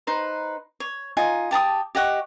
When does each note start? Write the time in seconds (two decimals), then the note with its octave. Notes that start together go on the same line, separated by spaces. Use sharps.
0.07 D#4 B4 C5
0.80 C#5
1.17 D#4 F4 D#5 G#5
1.51 G4 A5 A#5 D#6
1.95 G4 D#5 F#5 C#6